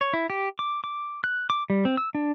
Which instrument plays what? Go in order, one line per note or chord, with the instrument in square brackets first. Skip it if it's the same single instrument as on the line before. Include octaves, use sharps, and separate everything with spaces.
[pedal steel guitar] C#5
E4
G4
D6
D6
F#6
D6
G3
C4
E6
D4